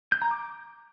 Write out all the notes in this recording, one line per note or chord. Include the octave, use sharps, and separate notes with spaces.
G6
A#5
D6